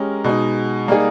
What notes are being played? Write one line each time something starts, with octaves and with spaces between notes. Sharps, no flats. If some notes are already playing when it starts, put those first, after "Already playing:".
Already playing: G#3 C#4 G4 A#4
B2 G#3 D#4
G3 A#3 D#4 G#4